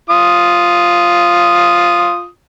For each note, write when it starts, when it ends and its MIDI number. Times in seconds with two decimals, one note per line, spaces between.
0.09 2.27 65
0.09 2.27 87